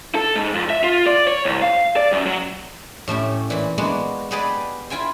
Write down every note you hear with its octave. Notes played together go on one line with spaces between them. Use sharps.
A4
G#2
F2
E5
F4
D5
C#5
C2
F5
D5
F#2
F#3
A2 A3 C#4 G4
A#2 E3
G#3 A#3 B3 D4 F#4
B3 G4 G#4 B4 D5 D#5
E4 F4 G5 G#5 C6